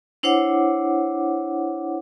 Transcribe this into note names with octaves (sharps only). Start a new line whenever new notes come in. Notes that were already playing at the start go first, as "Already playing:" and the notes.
D4 E4 C5 C#5 F#5 D6